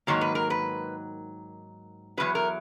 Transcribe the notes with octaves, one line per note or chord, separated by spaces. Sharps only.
G#2 D#3 F#3 A#3 C#5
B4
A#4
B4
E2 B2 F#3 B4
A#4